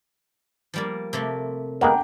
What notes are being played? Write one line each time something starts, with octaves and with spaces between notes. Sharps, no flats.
F3 G3 A#3
C3 A3 A#3
G#3 A#3 B3 D4 F#5 G5 A#5